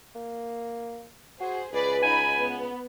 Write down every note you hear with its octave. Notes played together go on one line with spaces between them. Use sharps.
A#3
F#4 G#4 C5
C#2 G#4 B4 D5
D#4 G#5 B5
B3